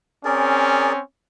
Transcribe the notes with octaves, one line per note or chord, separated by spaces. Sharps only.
C4 C#4 G#4 A#4 D5